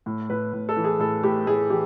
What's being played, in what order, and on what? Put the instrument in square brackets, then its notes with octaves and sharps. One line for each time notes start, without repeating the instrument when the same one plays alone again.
[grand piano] A2
A2 B4
A2
A4
E3
G#4
A2 A4
A2 G4
A2 G#4
E3 G4